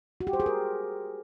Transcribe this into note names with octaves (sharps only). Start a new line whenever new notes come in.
F#4
G4
C5
G#4
A#4